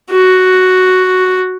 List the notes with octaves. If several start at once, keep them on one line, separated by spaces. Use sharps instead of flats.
F#4